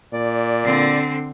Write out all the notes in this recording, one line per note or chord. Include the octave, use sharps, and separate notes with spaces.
A#2 D5
D3 C4